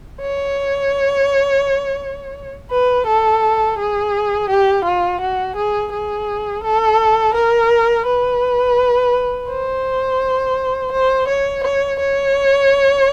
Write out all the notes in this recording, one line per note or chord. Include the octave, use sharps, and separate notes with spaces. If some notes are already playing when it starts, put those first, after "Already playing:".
C#5
B4
A4
G#4
G4
F4
F#4
G#4
G#4
A4
A#4
B4
C5
C5
C#5
C#5
C#5